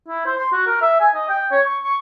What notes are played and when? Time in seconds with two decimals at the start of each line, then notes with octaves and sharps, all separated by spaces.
0.08 E4
0.26 C5
0.37 C6
0.53 F#4
0.67 A#4
0.82 E5
1.00 G#5
1.14 D#5
1.29 G5
1.52 C#5
1.66 C#6
1.84 C#6